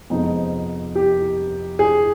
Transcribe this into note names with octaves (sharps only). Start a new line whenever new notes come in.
F2 C3 F3 G#3 B3 D#4
G4
G#4